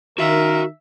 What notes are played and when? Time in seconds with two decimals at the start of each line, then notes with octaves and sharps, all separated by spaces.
0.18 D#3 F#4 A#4 E5 F5